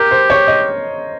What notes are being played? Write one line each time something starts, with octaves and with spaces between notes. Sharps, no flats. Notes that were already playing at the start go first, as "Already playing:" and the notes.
Already playing: G4 A#4
C5
C#5
D#5